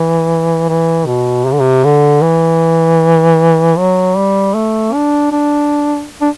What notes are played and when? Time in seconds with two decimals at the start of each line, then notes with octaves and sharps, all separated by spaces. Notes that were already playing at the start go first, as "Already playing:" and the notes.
Already playing: E3
0.68 E3
1.06 B2
1.46 C3
1.52 D3
1.59 C3
1.84 D3
2.22 E3
3.77 F#3
4.16 G3
4.55 A3
4.93 D4
5.32 D4
6.21 D4